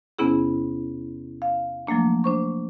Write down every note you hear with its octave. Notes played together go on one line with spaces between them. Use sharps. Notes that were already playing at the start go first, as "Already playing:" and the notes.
E2 C3 B3 C#4 E4 G#4
F5
F3 F#3 A3 A#3 D4
D4 C5 C#6